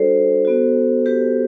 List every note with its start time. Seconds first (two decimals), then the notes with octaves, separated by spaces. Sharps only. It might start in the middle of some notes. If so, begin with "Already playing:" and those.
Already playing: G3 D4 F#4 A4 B4 C5 D5
0.45 B3 F#4
1.06 G4 B4